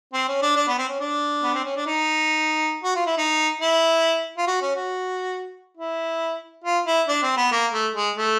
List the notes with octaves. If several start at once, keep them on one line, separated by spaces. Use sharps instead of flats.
C4
C#4
D4
D4
B3
C4
C#4
D4
B3
C4
C#4
D4
D#4
F#4
F4
E4
D#4
E4
F4
F#4
C#4
F#4
E4
F4
E4
D4
C4
B3
A#3
A3
G#3
A3